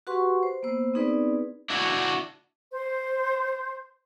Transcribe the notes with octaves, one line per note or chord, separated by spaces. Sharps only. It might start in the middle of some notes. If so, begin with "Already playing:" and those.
F#4 G4 B4 F#5 C6 C#6
C5
A#3 B3 C5 E6
B3 C4 D#4 G#4 B4 D5
D4 E4 F#4
C5